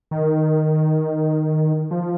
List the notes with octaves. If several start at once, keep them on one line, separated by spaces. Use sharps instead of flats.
D#3
F3